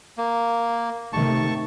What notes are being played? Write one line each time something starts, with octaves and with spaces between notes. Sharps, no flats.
A#3
C3 D#3 A3 A5 C#6